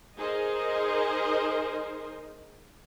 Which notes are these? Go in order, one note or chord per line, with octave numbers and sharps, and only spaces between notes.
D#4 G#4 A#4 C5 D#5